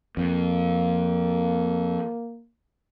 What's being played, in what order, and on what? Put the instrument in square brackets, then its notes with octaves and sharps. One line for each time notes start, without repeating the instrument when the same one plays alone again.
[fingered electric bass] F2 [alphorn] A#3